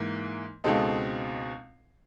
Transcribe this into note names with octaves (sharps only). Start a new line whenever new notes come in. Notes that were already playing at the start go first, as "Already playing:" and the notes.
Already playing: G#2 E3 A#3
C#2 B2 G#3 C4 D#4 A4